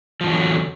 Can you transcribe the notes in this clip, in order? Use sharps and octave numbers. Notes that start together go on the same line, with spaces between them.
E2 G2 D3 F3 F#3